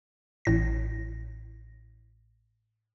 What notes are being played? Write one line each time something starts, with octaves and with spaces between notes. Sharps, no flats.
A1 A2 A#6